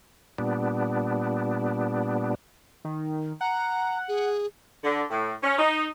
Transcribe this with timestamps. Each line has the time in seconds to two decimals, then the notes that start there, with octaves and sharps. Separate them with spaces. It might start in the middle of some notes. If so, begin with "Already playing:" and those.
0.38 A#2 G3 B3 D4
2.85 D#3
3.41 F#5 A#5
4.08 G#4
4.84 D3
5.10 A2
5.43 C#4
5.58 D#4